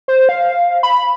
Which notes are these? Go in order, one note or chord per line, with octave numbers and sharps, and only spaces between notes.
C5
F5
B5